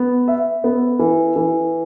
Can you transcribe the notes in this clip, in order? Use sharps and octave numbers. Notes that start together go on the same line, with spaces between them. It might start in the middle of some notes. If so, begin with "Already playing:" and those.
Already playing: B3
E5
B3
E3
E3